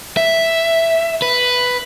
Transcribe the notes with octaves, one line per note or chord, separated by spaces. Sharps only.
E5
B4